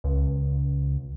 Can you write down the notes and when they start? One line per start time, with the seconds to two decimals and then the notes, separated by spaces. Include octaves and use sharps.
0.04 C#2